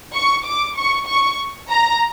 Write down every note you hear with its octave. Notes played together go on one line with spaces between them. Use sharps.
C#6
D6
C#6
C#6
A#5